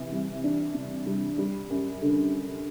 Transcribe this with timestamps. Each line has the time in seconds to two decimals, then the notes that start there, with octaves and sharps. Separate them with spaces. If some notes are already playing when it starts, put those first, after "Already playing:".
Already playing: C3 E3
0.12 G3
0.44 D4
0.74 C3
1.06 G3
1.38 G3
1.70 F#2
2.02 D3